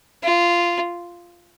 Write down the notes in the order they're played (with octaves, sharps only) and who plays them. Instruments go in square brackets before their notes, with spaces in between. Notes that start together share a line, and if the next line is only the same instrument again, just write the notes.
[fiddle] F4